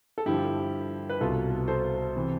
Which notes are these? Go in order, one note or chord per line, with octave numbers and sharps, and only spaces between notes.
A4
G2 D3 F3 E4 G4
B4
C2 B2 F4 A4
A4 C5
C3 E3